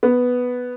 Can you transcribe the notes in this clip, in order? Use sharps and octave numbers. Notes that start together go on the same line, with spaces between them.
B3